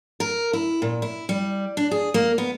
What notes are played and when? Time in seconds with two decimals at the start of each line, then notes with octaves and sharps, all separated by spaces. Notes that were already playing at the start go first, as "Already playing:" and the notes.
0.20 A#4
0.53 E4
0.82 A#2
1.02 E4
1.29 G3
1.77 D4
1.91 G#4
2.14 A#3
2.38 B3